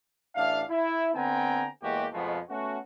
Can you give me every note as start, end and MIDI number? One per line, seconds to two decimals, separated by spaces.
0.35 0.61 33
0.35 0.61 62
0.35 0.61 76
0.35 0.61 77
0.70 1.10 64
1.15 1.69 50
1.15 1.69 59
1.15 1.69 60
1.15 1.69 79
1.15 1.69 80
1.15 1.69 82
1.82 2.07 40
1.82 2.07 56
1.82 2.07 58
1.82 2.07 66
1.82 2.07 67
2.14 2.39 41
2.14 2.39 47
2.14 2.39 53
2.14 2.39 56
2.14 2.39 57
2.14 2.39 59
2.50 2.78 57
2.50 2.78 59
2.50 2.78 61
2.50 2.78 66